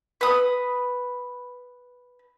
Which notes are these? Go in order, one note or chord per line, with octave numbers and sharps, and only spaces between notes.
B4 D#6